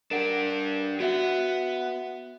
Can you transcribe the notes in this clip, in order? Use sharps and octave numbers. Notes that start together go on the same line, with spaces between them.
D4 G4 A#4 F#5
B3 F#4 E5 F#5